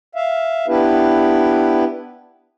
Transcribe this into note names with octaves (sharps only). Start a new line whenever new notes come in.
E5 F5
B3 D4 E4 G4 B4